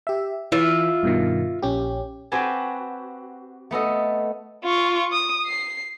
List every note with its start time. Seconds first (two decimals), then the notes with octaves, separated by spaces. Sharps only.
0.07 G4 E5
0.52 E3 F4 E5
1.03 G2 B2 D#3
1.62 A#1 C#4 G4
2.32 C4 F#4 G4 B4 G#5 A5
3.71 A3 B3 A4 D#5
4.64 F4 C#6
5.12 D#6
5.46 C7